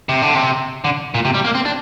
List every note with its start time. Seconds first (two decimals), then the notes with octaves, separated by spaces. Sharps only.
0.09 C3
0.22 D3
0.35 C3
0.84 D3
1.14 A#2
1.25 C3
1.34 G3
1.45 A#3
1.55 C4
1.65 D4